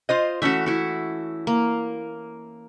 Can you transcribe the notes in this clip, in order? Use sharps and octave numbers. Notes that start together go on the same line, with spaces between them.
F4 C5 D#5
E3 A3 C#4 F#4 E5
E4 F#4
A#3